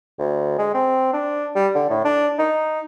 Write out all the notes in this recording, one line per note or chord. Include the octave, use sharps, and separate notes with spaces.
D2
G#3
C4
D4
G3
D3
A2
D4
D#4